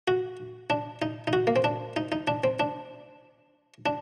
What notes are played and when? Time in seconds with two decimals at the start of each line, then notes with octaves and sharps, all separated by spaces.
0.08 F#4
0.70 D4
1.02 D#4
1.27 D#4
1.33 F#4
1.47 A#3
1.56 C4
1.64 D4
1.96 D#4
2.12 D#4
2.27 D4
2.44 C4
2.60 D4
3.86 D4